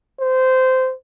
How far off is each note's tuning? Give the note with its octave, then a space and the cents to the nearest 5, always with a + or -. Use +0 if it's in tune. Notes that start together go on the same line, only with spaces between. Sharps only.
C5 -15